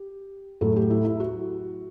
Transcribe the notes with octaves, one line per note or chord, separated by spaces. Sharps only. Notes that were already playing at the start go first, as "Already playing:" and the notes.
Already playing: G4
A2 F#3 A3 A4
G4
E4
E4
F#4